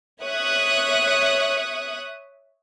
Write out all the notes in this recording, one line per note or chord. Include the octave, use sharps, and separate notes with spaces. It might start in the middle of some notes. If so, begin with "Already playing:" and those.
C#5 E5 C#6 D#6 F#6